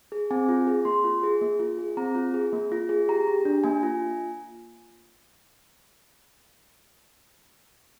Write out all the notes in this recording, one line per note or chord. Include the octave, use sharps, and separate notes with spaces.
G#4
C4 G#5
F4
G#4
A#3 C6
F4
G#4
A#3
F4
G#4
C4 A#5
F4
G#4
A#3
F4
G#4
G4 A#5
G4
D4
A#3 G#5
F4